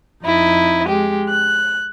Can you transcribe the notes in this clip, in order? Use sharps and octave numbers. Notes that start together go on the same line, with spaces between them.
F2 D#4 E4 D#5
G#3 G4
F#6